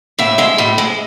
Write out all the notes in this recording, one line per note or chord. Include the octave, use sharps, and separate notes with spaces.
A2 E5
G#3 E5
A2
G#3